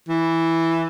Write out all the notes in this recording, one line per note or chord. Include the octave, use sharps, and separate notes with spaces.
E3